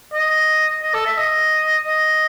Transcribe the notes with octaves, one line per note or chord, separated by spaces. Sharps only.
D#5
D#5
A4
E5
D#5
D#5